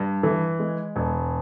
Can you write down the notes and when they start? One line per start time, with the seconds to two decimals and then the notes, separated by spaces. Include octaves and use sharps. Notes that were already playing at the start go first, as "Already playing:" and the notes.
Already playing: G2
0.23 E3
0.59 G#3
0.96 E1